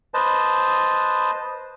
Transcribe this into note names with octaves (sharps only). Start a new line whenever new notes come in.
B4 C5 D#5 A5